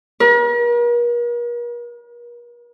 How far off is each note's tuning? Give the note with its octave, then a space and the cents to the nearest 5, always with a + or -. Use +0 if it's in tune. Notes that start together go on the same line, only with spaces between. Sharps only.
A#4 +45